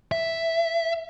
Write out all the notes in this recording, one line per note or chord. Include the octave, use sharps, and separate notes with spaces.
E5